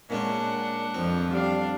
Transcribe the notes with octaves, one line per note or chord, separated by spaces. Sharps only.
A#2 G#3 C#4 D4 F#5
F2 F3 C4
G3 D4 F5